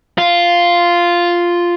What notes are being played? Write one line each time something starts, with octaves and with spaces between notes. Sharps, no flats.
F4